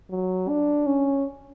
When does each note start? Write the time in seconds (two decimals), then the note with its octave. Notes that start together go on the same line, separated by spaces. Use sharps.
0.11 F#3
0.49 D4
0.87 C#4